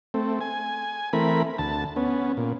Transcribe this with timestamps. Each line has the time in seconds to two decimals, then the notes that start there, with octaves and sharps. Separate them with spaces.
0.14 A3 C4
0.41 G#5
1.13 E3 A3 C4 A#4 B5
1.58 D2 A5
1.96 B3 C#4
2.37 A#2